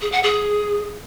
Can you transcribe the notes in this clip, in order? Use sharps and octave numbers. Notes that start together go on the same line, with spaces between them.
G#4
F#5
G#4